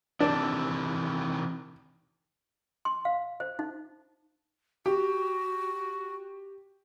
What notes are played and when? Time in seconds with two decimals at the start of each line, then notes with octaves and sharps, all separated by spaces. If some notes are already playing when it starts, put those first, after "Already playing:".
0.20 C3 D#3 E3 D4
2.85 C6
3.05 F5
3.40 C5
3.59 D#4
4.86 F#4 G4